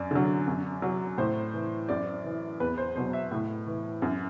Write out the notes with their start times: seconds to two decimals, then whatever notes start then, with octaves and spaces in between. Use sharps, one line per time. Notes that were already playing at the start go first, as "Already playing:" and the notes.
Already playing: F#2 D5
0.11 D3 F#3
0.48 F#2
0.82 F#3
1.18 A2 C5
1.54 E3
1.89 F#2 D5
2.24 E3
2.60 E2 B4
2.78 C5
2.96 B2 F#3 C5
3.13 E5
3.31 A2
3.67 E3
4.02 F#2